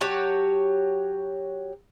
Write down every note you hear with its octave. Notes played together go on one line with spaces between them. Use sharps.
F#3 G4 C#5 A5